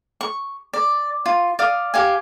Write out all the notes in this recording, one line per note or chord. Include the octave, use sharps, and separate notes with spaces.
C#6
D5
F4
D5 F5 D#6
G4 F5 G#5